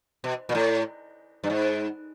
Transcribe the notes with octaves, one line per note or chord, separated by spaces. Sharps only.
B2
A#2
A2
G2
G#2